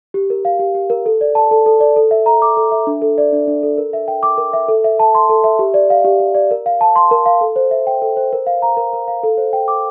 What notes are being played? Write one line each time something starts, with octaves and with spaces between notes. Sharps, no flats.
G4
A#4
F5
G4
G4
A#4
A4
D5
A5
A4
A4
D5
A4
E5
A#5
D6
A4
E5
D4
A4
D5
D4
D4
A4
A#4
E5
G5
D6
A#4
E5
A4
E5
A5
C6
A4
E5
G4
D5
F5
G4
G4
D5
A#4
F5
A5
C6
A#4
F5
A4
C5
E5
G5
A4
C5
A#4
F5
A#5
A#4
A#4
F5
A4
C5
G5
D6